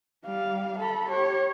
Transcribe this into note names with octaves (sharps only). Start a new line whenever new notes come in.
G3 F5
A4 B5
G4 C#5